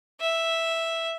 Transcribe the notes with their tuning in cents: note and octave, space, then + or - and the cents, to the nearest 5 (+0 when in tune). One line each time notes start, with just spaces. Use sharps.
E5 +0